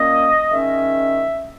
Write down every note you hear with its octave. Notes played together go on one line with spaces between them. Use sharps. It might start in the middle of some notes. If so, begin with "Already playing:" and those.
Already playing: A#2 A#3 C#4 D#5
D#3 G#3 C#4 E5